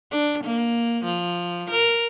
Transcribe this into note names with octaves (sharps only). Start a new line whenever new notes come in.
D4
A#3
F3
A#4